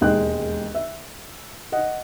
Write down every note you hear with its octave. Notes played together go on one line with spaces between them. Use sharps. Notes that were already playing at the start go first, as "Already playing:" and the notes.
E1 D#2 G#3 G5 F#6
E5
D#5 F#5